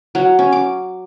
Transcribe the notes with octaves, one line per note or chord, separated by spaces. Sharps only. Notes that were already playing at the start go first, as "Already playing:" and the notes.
F#3
C#4
D6